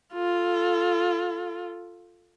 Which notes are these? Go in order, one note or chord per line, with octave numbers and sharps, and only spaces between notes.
F4 A4